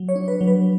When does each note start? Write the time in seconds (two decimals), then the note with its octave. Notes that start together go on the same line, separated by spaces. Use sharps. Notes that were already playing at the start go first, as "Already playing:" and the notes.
Already playing: F#3
0.09 C#5
0.16 D4
0.28 B4
0.41 F#3
0.47 B4